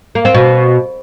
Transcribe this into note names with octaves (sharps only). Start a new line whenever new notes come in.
A#3
C4
B2